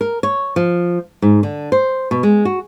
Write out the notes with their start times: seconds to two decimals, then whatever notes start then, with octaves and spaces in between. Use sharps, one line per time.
0.01 A#4
0.23 C#5
0.56 F3
1.22 G#2
1.43 D3
1.72 C5
2.11 B2
2.23 G#3
2.45 F#4